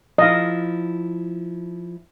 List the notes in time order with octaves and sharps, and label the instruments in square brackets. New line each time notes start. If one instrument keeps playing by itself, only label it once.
[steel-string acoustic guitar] F3 E4 [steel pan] D#5 F5